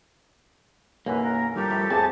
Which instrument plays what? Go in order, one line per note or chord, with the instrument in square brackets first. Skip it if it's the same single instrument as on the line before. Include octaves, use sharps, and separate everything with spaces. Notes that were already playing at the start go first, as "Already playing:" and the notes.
[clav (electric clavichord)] B1 F#2 E3 [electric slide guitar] A#3 [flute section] B4
[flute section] A#4
[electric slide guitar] G2 F3 A#4 [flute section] G4 A4
[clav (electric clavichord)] A2
[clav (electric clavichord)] F2 A2 [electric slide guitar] C4 [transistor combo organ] G#4 A5